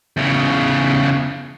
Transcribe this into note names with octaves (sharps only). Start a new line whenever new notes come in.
E2 C#3